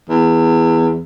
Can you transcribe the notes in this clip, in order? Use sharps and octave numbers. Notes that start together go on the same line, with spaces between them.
E2